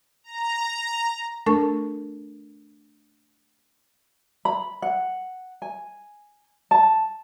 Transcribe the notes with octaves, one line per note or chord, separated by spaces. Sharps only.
A#5
A3 D4 A4 A#4 C#6
B5
F#5
G#5
A5